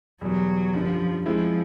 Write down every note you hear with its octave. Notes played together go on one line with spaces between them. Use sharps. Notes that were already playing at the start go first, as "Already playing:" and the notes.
E2 B2 F#3 G3
F#2 D3 F3 G3
F3 G#3 C4 E4